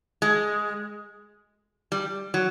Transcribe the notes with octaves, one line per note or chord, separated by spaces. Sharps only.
G#3
G3
F#3